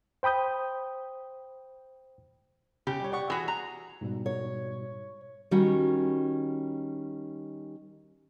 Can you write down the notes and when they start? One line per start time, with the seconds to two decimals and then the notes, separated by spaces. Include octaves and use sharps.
0.23 C5 G5 B5 D#6 G6
2.87 C#3 G4
3.00 G3 C#5
3.12 D5 F#5 C#6
3.30 E3 F#4 G#4
3.48 A#5
4.01 G#2 B2 G3
4.26 C#5
5.51 D#3 G3 C#4 F#4 F#5